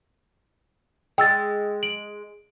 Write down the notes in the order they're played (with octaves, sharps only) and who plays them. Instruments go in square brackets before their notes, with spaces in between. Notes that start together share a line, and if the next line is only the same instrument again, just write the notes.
[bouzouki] G#3 [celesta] G5 E6 A6
[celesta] D7 F#7